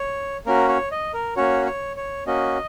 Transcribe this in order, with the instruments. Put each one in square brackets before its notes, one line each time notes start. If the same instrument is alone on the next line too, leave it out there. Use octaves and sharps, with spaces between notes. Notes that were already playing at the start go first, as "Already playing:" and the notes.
Already playing: [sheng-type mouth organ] C#5
A#3 C#4 F#4 A#4
C#5
D#5
A#4
A#3 C#4 F#4 C#5
C#5
C#5
A#3 C#4 F#4 D#5